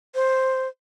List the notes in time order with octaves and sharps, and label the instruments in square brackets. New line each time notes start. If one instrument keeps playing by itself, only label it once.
[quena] C5